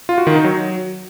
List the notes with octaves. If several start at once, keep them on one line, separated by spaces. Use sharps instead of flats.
F4
F#4
D#3
D#4
F#3